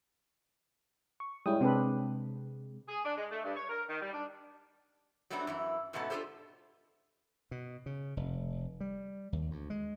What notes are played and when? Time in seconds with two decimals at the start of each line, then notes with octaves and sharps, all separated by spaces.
1.20 C#6
1.46 G3 G#3 C#4 E4 G5 D#6
1.61 C3 G#3 C4 D4 B4
2.89 G#4
3.05 D4
3.17 G#3
3.31 A3
3.44 G2
3.56 C#5
3.69 A#4
3.90 D#3
4.02 G3
4.14 D4
5.30 F#3 G3 A3 B3 C4 D4
5.47 F#2 E3 E4
5.93 G#2 B2 A3 B3 C#4 A5
6.10 D4 F4 G4 A4 C5
7.51 B2
7.86 C#3
8.17 F1
8.80 G3
9.33 D#2
9.51 D2
9.70 G#3